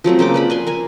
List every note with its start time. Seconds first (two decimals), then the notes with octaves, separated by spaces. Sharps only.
0.04 F3 F#3 A3 C4
0.19 C#3 A#3 G5 D6
0.34 B4 D5 B5
0.50 D5 G#5 C6
0.67 A#4 G#5